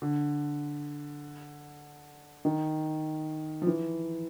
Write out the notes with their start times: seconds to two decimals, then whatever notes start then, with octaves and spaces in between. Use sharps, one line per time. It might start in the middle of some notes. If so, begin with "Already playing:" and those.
0.02 D3
2.45 D#3
3.62 F3
3.67 E3